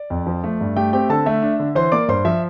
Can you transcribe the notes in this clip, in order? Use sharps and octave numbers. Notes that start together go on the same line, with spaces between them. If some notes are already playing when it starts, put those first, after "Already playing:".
Already playing: D5
F2
F3
A3
G2
A3 G4 G5
C4 G4 G5
D3 A4 A5
A3 E5
D4
D3
E3 C5 C6
A#3 D5 D6
G2 C5 C6
F3 E5